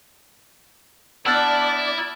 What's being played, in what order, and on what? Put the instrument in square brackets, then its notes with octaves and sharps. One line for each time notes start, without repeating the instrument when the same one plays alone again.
[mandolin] B3 D4 A5 [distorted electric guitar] E4 [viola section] D5 [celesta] E6 F6 A6